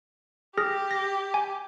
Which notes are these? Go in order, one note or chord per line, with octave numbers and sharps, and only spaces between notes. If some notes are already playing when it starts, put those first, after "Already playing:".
G4 G#4 F6 A#6
A#6
G#5